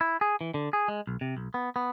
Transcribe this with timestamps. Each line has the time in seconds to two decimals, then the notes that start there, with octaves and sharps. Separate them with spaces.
0.01 E4
0.21 G#4
0.41 E3
0.54 D3
0.73 G#4
0.88 G#3
1.07 B1
1.21 C3
1.37 B1
1.54 B3
1.76 B3